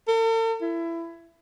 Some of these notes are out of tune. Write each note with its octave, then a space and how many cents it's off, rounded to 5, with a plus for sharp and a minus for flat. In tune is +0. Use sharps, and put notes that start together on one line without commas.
A4 +45
E4 +20